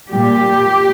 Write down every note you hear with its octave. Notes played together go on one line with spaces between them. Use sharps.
A#2 G3 G4